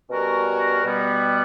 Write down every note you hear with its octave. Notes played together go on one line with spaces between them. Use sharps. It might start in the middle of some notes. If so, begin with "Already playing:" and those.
B2 G3 C#4 F#4 A#4
B2 G3 B3